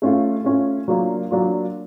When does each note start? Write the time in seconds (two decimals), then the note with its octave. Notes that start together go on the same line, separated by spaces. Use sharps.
0.02 A3 C#4 F4
0.44 A3 C#4 F4
0.88 F#3 A#3 D4 F4
1.31 F#3 A#3 D4 F4